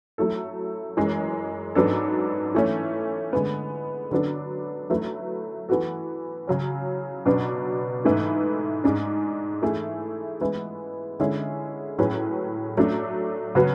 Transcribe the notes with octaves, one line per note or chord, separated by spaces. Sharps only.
F#3 A3 E4 A4
F#2 E3 G#3
G#2 F#3 B3 D4 A4
E3 A3 C#4
D3 G#3 B3
D3 F#3 B3 D4 A4
F#3 A3 E4 B4
E3 B3 F#4 A4
C#3 F#3 C#4
B2 F#3 B3 D4
G#2 E3 A3 E4 B4
G#2 G#3 D4
E3 A3 E4 G#4
E3 G#3 B3 E4
D3 G#3 C#4 E4 G#4
A2 F#3 C#4 G#4 B4
F#3 A3 D4
C#3 F#3 B3 F#4 B4